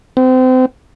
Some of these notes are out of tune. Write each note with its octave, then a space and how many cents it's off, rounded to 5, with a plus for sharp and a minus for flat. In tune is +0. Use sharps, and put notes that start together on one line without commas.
C4 -30